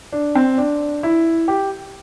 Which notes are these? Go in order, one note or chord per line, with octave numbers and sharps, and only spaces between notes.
D4
C4
D4
E4
G4